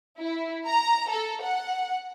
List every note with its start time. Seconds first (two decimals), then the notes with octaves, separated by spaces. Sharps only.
0.18 E4
0.67 A#5
1.10 A4
1.43 F#5